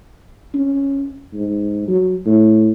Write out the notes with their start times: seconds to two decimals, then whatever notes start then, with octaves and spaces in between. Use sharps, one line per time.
0.55 C#4
1.34 G#2
1.88 F#3
2.26 A2